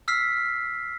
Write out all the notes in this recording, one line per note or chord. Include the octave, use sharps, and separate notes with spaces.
E6 F6 B6 C7